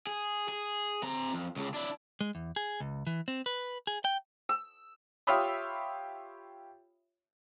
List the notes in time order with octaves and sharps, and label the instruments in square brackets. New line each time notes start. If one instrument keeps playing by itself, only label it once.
[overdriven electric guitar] G#4
G#4
C4 A#5
F2
C#2 C#3
D4 E4
[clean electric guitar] G#3
E2
G#4
C#2
E3
C4
B4
G#4
G5
[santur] E6
[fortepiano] F4 G4 C#5 E5 B5 D#6